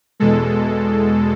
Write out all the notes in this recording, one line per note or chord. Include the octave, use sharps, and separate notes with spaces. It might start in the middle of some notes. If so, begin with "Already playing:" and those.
E2 B2 G#3 A4